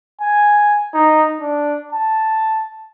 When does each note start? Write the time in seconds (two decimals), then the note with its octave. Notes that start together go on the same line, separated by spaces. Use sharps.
0.21 G#5
0.94 D#4
1.41 D4
1.93 A5